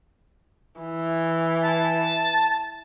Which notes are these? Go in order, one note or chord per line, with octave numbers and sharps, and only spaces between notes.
E3
A5